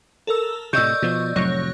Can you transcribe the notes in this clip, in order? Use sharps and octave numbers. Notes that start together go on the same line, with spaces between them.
A4 A#4 E6
A2 C3 D5 D#5 C#6 E6 G6
B2 F3
F1 A2 F#3 C#5 A#6